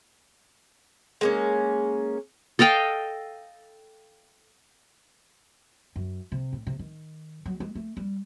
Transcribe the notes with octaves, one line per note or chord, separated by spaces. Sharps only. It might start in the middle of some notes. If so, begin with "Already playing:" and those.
G#3 A#3 C#4
A4 D#5 F5 G5
F#2
C3
A2
C3
D#3
F#3
G#3
A3
G3